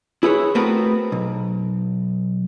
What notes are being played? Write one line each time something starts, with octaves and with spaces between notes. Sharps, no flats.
E4 G#4 B4 C#5
A3 B3 C4 F#4 A#4 B4
B1